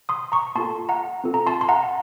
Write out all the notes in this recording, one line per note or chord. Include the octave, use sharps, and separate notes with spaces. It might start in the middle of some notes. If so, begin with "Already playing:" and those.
C6 D#6
A#5 C#6
A#3 F4 A4 A5 C6
F#5 A#5
C4 F4 A4
A#5
A5 C6
C6
F#5 A#5